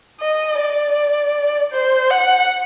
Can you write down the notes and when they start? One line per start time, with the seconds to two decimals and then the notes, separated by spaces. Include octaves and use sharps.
0.21 D#5
0.59 D5
1.73 C5
2.10 F#5